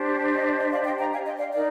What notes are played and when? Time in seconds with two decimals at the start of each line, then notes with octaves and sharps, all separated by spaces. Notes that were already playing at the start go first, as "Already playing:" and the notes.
Already playing: D4 G4 C5
0.35 D#5
0.45 D5
0.59 D#5
0.72 D5 F5
0.86 D#5 G5
0.99 G5 A#5
1.13 F5 G#5
1.25 D#5 G5
1.39 D5 F5
1.52 D#4 A#4 D5